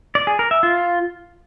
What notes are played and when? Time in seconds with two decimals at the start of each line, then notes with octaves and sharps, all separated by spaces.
0.15 D5
0.27 G#4
0.39 A#4
0.51 E5
0.63 F4